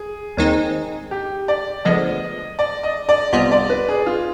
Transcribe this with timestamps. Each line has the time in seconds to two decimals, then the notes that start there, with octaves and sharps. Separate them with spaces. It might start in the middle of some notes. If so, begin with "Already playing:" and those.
Already playing: G#4
0.37 D#2 D#3 G#3 C4 D#4
1.11 G4
1.48 D5
1.85 D2 D3 F3 G#3 B3 D#5
2.59 D5
2.83 D#5
3.09 D5
3.33 C2 C3 G3 B3 F4 D#5
3.51 D5
3.70 B4
3.89 G#4
4.06 F4